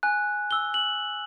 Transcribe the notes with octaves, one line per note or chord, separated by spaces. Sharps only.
G#5 F#6
E6 G7
F#7